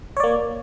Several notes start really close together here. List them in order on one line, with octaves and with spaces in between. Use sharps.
C#5 D5 A#3